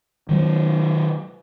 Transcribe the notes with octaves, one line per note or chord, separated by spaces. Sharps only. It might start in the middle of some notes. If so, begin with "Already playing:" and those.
D#3 F#3